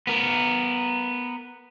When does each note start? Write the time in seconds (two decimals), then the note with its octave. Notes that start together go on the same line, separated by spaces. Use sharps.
0.07 B3 A#4